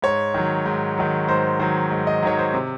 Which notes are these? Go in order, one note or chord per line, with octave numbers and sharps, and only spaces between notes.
G#2 C#5
D#3 F#3
G#2
D#3 F#3
G#2 C5
D#3 F#3 C5
G#2
D#5
D#3 F#3 C#5
C5
C3